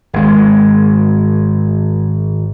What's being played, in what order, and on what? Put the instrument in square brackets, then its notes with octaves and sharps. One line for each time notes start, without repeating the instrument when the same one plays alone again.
[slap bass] G#1 G#3